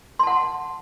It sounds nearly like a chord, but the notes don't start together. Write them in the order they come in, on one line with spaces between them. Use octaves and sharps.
C6 A5 F#5